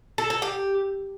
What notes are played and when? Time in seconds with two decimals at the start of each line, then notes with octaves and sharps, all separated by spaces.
0.18 A4
0.30 A4
0.42 G4